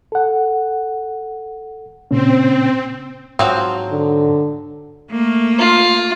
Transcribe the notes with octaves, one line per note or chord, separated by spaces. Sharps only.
A4 F#5
A#2 C#3 C4 C#4
G#2 F3 F#3 C4
D3
A3 A#3
F4